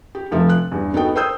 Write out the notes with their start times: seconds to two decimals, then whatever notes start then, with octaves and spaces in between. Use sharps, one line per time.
0.15 G4
0.31 F1 F3 A4 E5
0.50 F#6
0.71 E2 G2
0.94 B3 D#4 F#4 A4 G5
1.15 A#4 C5 G5 D#6 E6 G6